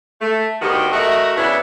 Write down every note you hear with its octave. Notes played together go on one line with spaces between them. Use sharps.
A3
D2 D#3 B3 F#4 G4 D#5
A3 F#4 A#4 D#5 E5
C#3 B3 D4 E4